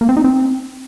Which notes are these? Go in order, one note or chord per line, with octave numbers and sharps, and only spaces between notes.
A#3
C4
D#4
C4